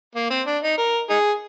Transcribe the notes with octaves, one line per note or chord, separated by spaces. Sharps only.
A#3
C4
D4
D#4
A#4
D#4 G#4